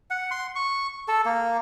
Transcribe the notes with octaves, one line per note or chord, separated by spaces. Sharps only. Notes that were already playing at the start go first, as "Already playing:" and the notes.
F#5
C6
C#6
A4
A#3